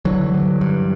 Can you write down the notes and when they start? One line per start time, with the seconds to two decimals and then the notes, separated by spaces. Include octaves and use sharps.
0.05 D3 E3 F#3
0.34 G2
0.61 G2